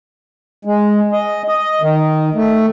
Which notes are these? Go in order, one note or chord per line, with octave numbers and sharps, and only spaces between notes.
G#3
D#5
D#5
D#3
A3